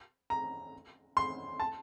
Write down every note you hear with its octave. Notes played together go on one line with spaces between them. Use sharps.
A#5
C6
A5